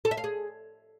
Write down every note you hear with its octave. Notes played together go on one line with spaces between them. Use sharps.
A4
E5
F5
G#4